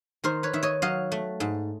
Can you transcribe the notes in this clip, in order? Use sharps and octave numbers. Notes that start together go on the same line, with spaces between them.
D#3 A#4 C5
B4 C#5
D#3 E5
C#5 D#5
F#3 D#5 F5
A3
G#2